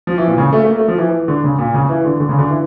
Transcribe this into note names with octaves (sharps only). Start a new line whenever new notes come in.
F3
E3
A#2
C#3
A3
A3
A#3
A3
F3
E3
E3
D3
C#3
A#2
C#3
E3
D3
D3
C#3
D3
E3